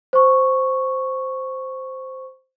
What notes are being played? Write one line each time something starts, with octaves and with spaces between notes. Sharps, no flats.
C5 C#6